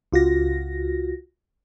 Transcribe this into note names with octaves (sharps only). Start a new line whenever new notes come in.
C#2 F4 F#4 A#6